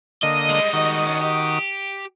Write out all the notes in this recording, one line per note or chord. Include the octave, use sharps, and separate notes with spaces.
D3 A#3 D#5
G3 G#3
D#3 F#4 D#6
C#4 D4
G4